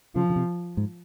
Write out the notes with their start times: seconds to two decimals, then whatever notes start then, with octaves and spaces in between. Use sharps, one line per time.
0.15 C#3 F3
0.30 C#3
0.36 C3
0.77 G#2